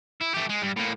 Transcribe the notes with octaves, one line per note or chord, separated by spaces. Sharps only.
E4
A3 G4
G#3
G2
A2 A#3